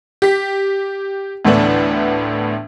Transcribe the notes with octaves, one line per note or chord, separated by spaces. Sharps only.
G4 B6
D2 A2 E3 A3 B3 D4